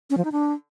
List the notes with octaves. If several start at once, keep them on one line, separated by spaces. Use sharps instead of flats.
C#4
F3
D#4
D4